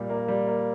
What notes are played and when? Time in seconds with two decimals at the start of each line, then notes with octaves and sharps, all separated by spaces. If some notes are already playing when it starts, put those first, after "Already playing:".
Already playing: A#2 G3
0.09 A#3
0.28 G3
0.47 A#3